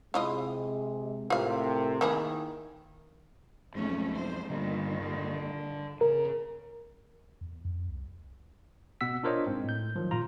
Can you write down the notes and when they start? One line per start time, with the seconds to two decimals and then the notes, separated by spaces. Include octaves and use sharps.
0.14 C3 G#3 E4 F4 D#5
1.30 A2 C3 F4 A#4 F5
2.01 D#3 A#3 E4 G#4
3.75 B1 F2 G#2 A3 C#4
4.16 C5
4.50 G2 A#2 D3 D#3 G3 B3
5.01 D3
6.01 C#3 A#4
7.41 E2
7.65 F2
7.88 C2
9.01 B2 B3 F#5 E6 B6
9.23 D4 F4 A#4 C5 C#5 D#5
9.46 G#2 C4
9.64 A2 G6
9.96 D#3 F3 F#3
10.11 G#1 A#2 F4 A#5